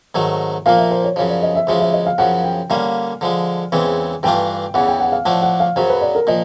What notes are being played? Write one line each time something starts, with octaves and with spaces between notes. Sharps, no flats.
G#2 D#3 F#3 A3
A#2 F3 A#3 F5
E5
C5
C#5
F#2 C#3 F3 C#5
D5
D#5
E5
D2 C#3 F3 G#3 E5
E5
D#5
F5
F#2 C#3 F3 F#5
G5
D3 G3 A#3 C#4 F5
D3 F3 G#3
E2 C#3 E3 G#3 C4
G2 E3 A3 D4 F4 G5
E2 C#3 E3 F#5
G5
F#5
F5
A2 F3 A3 D4 F#5
F#5
F5
F#2 C#3 F#3 C5
B4
D5
A#4
A#2 F3 D#5